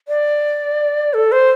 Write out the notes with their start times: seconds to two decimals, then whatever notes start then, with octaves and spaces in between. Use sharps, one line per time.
0.08 D5
1.14 A4
1.32 C5